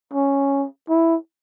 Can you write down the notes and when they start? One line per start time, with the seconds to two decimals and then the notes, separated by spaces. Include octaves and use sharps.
0.13 C#4
0.89 E4